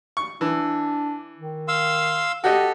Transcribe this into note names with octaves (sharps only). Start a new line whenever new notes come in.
C#6
E3 D4
D#3
F5 C6 E6
F#4 G4 A4 D#5